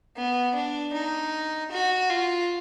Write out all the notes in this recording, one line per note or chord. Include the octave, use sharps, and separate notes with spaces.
B3
D4
D#4
F#4
F4